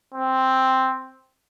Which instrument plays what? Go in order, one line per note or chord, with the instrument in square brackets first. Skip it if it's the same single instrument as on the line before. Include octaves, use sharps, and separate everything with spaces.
[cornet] C4